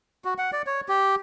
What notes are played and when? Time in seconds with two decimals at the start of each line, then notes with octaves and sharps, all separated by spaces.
0.25 F#4
0.38 F#5
0.53 D5
0.67 C#5
0.89 G4